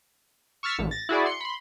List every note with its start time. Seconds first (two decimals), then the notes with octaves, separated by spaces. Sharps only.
0.63 C#6 E6 F6 A6 B6 C#7
0.79 A1
0.91 A6 A#6
1.09 E4 F#4 G#4 D5
1.26 C6 C#7
1.40 B5 C6